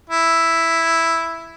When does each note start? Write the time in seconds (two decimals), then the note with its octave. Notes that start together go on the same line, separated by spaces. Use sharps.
0.10 E4